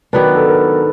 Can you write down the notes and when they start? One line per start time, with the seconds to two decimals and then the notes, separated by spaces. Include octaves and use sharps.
0.13 D#3 F#3 B3 D4 B4
0.35 A4
0.48 A#4